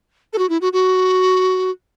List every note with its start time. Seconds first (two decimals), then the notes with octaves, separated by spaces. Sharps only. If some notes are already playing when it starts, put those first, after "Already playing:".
0.33 A4
0.38 F#4
0.49 E4
0.61 F#4
0.73 F#4